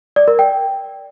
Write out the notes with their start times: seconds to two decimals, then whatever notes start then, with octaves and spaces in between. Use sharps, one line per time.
0.16 D5
0.28 A#4
0.39 G5